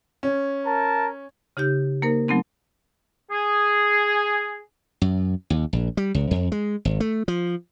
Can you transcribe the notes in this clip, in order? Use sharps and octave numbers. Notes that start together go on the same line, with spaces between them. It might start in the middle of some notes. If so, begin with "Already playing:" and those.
C#4
A#4 A5
C#3 D#4 G4 G6
A#3 D#4 A#4 C5
F#3 A3 B3 C4 D#4
G#4
F#2
D#2
A#1
G3
C#2
F2
G#3
G#1
A3
F3